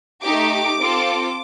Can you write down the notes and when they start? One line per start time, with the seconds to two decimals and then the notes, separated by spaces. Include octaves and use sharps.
0.22 A3 D#4 G4 D6
0.79 C4 F4 A4